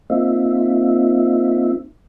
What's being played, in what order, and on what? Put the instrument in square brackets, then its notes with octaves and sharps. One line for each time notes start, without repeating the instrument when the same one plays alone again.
[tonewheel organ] A#3 C4 D#4 F4 E5